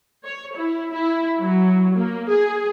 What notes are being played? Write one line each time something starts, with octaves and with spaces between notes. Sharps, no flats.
C#5
E4
E4
F#3
A#3
G#4